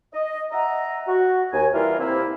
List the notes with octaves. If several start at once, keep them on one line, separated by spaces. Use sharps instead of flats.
D#5
D#5 E5 F#5 A#5
F#4
D#2 G#5
E3 G3 E4 F4 A#4
C3 A#3 E4